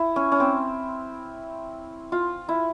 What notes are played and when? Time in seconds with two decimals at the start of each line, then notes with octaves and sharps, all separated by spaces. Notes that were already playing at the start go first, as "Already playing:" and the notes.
Already playing: E4
0.16 C#4
0.32 C#4
0.40 C4
2.12 F4
2.49 E4